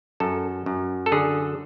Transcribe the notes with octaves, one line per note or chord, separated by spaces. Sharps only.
F#2 A4
F#2
A4
D3 G#4